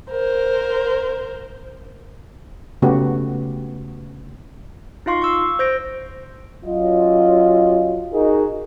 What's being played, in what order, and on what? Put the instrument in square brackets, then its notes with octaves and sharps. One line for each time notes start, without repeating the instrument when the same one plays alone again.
[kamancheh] A#4 C5
[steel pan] C#3 A3 B3 F#4 G4
[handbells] D#4 F4 F5 C6 C#6
C#6 E6
C5 G6 A#6 D7
[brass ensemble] F#3 C#4 F4 D#5
D#4 F#4 G#4 A#4